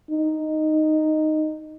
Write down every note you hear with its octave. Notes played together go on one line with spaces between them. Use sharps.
D#4